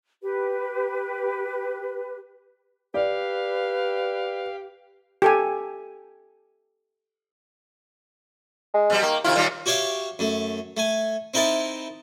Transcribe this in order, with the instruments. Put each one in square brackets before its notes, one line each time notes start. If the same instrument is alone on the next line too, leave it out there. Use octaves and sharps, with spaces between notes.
[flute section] G4 B4
[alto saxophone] G4 [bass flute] B4 [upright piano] D5 [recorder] F5
[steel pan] G4 A4 G#5
[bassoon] G#3
[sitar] B2 G3
[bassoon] D#3 [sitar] A#3
[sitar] C3 D#3 E4 [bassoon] F4
[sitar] D#2 A#2 G3
[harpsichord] F#4 G4 C#5 E5 F5
F#2 A3
A3 G#5
C4 D#4 E4 A#4 A5